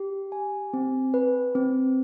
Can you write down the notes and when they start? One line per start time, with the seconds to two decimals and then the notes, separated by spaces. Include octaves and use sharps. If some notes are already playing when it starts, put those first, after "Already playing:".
Already playing: G4
0.32 G#5
0.73 C4
1.14 B4
1.55 C4